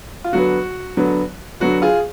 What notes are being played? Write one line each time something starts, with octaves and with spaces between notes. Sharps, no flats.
F4
D3 F#3 B3 F#4
D3 F#3 B3
D3 F#3 B3 F#4
F4 G#4